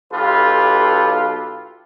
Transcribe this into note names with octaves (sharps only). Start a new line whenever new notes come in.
B1 F4 G4 A4 B4